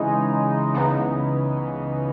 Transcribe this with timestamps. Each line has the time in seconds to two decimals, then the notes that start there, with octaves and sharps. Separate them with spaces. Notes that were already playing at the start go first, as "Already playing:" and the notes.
Already playing: C#3 E3 G#3 D#4
0.74 C#2 C#3 E3 B3 D#4